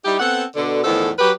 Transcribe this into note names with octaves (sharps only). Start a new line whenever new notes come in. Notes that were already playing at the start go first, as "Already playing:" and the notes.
G3 D#4 E4 G4
B3 C4 A4 F#5
B2 D3
E2 A2 D#3 F3 B3 A4
F#3 G4 B4